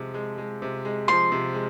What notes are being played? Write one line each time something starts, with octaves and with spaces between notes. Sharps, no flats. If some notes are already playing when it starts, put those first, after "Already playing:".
Already playing: C3 F3 G#3
G#3
G#3
C3
G#3
F3 C6
C3
G#3